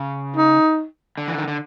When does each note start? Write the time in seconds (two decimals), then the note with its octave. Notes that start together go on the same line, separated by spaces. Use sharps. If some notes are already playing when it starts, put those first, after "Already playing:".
Already playing: C#3
0.36 D#4
1.18 D3
1.28 E3
1.38 D#3
1.48 D3